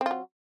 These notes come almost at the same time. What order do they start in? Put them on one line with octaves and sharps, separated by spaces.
C4 F4 F#3